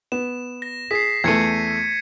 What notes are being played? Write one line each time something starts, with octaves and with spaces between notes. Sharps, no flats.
B3 E7
A#6
G#4 B6 C7
E2 A3 G#6 C#7 D#7